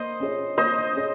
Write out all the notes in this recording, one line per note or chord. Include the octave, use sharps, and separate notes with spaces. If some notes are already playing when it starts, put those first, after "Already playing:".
Already playing: A#3 C5 D#5
C#4 G#4 C#5
A#3 C5 D#5
C#4 G#4 C#5